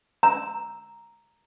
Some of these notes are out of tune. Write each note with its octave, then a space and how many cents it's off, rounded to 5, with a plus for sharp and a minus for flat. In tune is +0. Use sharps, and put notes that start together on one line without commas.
A#5 +0 E6 +0